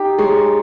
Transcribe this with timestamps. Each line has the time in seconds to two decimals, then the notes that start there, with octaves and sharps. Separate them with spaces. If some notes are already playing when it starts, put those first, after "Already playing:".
Already playing: D#4 G4
0.18 G#3 C#5